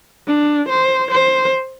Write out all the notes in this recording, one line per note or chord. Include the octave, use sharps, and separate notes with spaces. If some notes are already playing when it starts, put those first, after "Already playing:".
D4
C5
C5